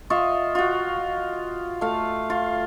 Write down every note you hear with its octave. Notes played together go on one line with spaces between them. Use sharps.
F4 D#5 E5 C#6
F4 F#4
A3 F5
F4